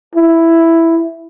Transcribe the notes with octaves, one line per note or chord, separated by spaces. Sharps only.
E4